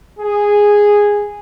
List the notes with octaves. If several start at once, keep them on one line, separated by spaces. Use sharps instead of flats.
G#4